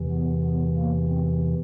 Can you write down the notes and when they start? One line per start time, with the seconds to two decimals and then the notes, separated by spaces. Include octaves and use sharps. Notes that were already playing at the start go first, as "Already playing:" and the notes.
Already playing: E2 C3 E3
0.11 B3
0.43 B3
0.76 A#3
1.09 C4